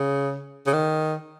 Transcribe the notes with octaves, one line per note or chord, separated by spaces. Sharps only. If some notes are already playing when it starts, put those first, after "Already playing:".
Already playing: C#3
C#3
D#3